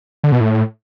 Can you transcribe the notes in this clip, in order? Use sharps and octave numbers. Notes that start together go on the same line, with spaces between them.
D3
B2
A2